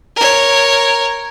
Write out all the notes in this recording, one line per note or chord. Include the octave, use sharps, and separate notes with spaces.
A#4 C#5